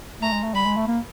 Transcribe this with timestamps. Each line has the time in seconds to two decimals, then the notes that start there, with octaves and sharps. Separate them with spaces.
0.21 A3 A#5
0.33 G#3
0.43 A3
0.54 G3 B5
0.65 G#3
0.77 A3
0.88 A#3